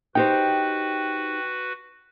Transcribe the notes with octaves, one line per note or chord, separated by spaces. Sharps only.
D#4 F#4 G4 B4 C5 G5